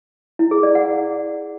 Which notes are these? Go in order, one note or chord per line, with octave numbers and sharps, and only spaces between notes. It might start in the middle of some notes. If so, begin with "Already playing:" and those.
E4
G#4
D5
F#5